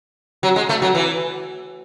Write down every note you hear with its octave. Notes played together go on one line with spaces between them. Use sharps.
F#3
G#3
A3
F#3
E3